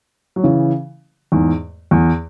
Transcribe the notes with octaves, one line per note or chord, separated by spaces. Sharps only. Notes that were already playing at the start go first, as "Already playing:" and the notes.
F#3
C#3 E3
E2 G#2
E2